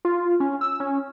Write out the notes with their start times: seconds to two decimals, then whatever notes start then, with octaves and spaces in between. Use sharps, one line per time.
0.05 F4
0.40 C#4
0.61 E6
0.80 C#4